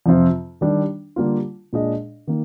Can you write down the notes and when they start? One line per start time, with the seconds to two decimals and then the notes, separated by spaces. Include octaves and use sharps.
0.06 F2 C3 F3 C4 F4
0.61 D#3 G3 D4
1.16 D3 G3 A#3 F4
1.73 A#2 G#3 D4 G#4 D#5
2.27 D#3 A#3